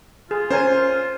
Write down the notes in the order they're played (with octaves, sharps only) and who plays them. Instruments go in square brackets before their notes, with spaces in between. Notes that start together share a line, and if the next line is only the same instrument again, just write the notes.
[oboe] F4 [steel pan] G#4
[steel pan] C#4 A#4 G#5 [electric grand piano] C5